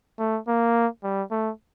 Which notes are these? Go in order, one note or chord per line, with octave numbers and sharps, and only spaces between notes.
A3
A#3
G3
A3